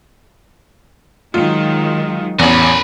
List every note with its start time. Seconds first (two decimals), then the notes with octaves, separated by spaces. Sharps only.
1.34 D#3 F#3 G#3 F4
2.39 A1 E2 A#4 B5